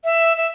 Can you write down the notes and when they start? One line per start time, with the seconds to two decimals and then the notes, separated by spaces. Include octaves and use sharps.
0.04 E5
0.37 E5